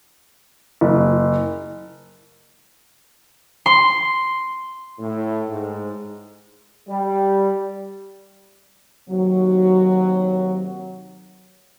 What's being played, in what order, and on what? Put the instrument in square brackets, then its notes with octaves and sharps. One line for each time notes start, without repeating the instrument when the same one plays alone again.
[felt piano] F#1
[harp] C6
[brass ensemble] A2
G#2
[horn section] G3
[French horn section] D#2 C3 F#3